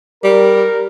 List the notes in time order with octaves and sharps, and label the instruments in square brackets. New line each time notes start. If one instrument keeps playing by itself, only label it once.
[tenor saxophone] G3 [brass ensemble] A#4